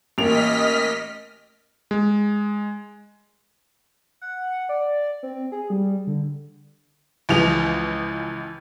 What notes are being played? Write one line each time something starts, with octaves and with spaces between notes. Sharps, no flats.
A1 A#3 D#5 F6 B6 F7
G#3
F#5
D5
C4
G#4
G3
D3
C#2 E3 F3 F7